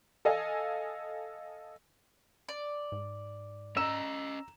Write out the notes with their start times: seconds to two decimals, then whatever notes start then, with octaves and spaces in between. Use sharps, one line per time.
0.25 A4 D#5 F5 G#5
2.49 D5
2.92 G#2
3.76 C#4 D#5 A#5 E6 E7